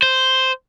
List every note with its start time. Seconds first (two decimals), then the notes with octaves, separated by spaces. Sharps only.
0.02 C5